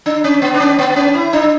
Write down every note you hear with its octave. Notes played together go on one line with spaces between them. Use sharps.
D4
C#4
B3
D4
C#4
B3
C#4
E4
D4